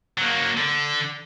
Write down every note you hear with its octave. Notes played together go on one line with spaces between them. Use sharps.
F#3 A#3
D3